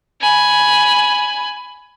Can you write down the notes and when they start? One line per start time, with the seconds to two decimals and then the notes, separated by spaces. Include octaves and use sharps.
0.21 G#5 B5